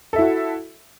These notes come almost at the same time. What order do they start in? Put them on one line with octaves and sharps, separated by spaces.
A4 E5 E4 F#4